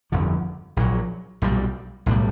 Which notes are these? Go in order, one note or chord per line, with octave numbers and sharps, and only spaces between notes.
G1 F2 D3 F3
A#1 A#2 F#3
B1 A#2 G3
B1 A2 E3 G3